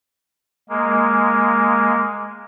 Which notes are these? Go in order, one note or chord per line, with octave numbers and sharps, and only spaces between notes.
G#3 A#3